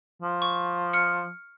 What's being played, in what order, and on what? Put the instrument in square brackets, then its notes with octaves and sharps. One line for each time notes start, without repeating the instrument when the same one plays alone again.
[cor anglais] F3
[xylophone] C#6
F6 C#7